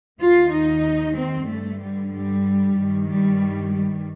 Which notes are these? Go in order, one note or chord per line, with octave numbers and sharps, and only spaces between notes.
D#2 D#3 F4
D#4
C4
G2 D3 A3
G3
G3
G2 D#3
G3
G3